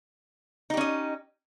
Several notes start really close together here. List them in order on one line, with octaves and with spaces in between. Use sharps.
D#4 G4 C#4 D#5